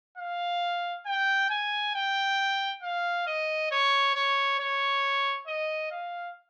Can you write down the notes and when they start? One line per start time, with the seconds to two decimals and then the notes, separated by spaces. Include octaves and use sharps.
0.17 F5
1.06 G5
1.50 G#5
1.94 G5
2.83 F5
3.26 D#5
3.70 C#5
4.15 C#5
4.59 C#5
5.47 D#5
5.91 F5